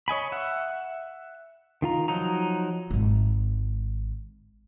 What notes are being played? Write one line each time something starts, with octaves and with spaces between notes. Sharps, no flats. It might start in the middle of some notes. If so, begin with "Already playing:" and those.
C#5 D#5 G#5 B5
E5 F#5
D#3 F4 A#5
F3 F#3 D#4 A#5
D#1 G#1